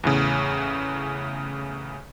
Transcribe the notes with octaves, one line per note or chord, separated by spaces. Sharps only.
E2 A2 C#3